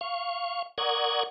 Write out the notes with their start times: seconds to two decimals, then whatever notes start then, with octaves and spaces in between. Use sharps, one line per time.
0.01 F5 C#6
0.78 A#4 D5 F#5 C#6 D#6 G#6